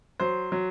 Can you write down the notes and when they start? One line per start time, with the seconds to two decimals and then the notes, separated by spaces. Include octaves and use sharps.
0.20 F#3 C5
0.52 F#3